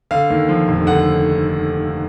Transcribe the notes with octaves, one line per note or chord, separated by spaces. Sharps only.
D3 F5
D#2
F3
F1
D3 F#5